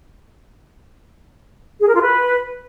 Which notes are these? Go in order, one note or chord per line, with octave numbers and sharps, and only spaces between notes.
G#4
A#4
F4
B4